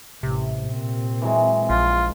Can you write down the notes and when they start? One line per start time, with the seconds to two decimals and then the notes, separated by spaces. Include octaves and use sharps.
0.23 A1 C3
0.69 A#2 C4
1.22 E3 F#3 G#3
1.70 A#1 F4